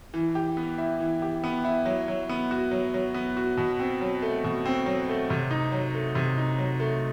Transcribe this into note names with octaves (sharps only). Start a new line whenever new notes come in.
E3
G4
B3
E4
E3
G4
B3
E4
F#3
F#3
B3
F#4
F#3
F#3
B3
F#4
B2
C4
F#3
A3
B2
C4
F#3
A3
C3
D#4
F#3
A3
C3
D#4
F#3
A3